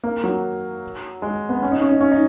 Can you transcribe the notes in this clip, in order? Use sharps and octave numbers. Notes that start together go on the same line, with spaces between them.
A#3
F#3
G#3
B3
C#4
D#4
C#4
D#4
C#4
D#4